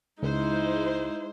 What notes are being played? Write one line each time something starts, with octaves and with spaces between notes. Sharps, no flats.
C#2 G#3 D#4 E4 C5